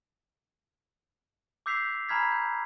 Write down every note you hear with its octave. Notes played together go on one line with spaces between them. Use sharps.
D6 E6 G6 B6 C7 F7
G#5 A#5 B5 F6 G#6 B6
G6